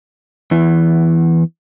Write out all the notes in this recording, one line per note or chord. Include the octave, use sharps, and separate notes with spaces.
E2 E3